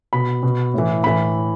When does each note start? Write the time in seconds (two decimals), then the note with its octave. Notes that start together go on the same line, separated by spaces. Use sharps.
0.13 B2 B5
0.43 B2
0.74 A2 E3
1.04 A2 E3 B5